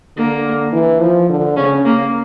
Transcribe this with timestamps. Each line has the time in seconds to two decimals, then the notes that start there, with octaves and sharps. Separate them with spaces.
0.17 D3 A#3
0.72 E3
1.01 F3
1.30 D3
1.56 C#3 C#4
1.85 A#3